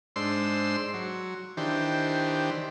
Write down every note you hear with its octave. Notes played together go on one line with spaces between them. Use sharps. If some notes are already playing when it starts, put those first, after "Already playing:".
G#2 D4 C5 C6 E6
F#3
D#3 E3 D4 G4 C5